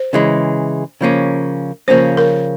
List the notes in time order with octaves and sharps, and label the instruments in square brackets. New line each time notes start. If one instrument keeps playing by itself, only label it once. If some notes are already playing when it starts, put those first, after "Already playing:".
Already playing: [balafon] C5
[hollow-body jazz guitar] C#3 E3 G#3
C#3 F3 A#3 C#4
[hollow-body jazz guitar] C#3 F3 A#3 C#4 [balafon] C5
[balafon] A#4